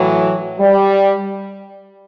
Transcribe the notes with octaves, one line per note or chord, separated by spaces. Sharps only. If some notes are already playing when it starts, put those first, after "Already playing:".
Already playing: A2 E3 F#3
G3